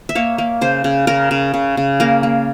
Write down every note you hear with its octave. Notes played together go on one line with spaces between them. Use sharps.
E5
A#3 C#5
A#3
C#3 C5
C#3
C#3 A#4
C#3
C#3
C#3
A#3 A#4
A#3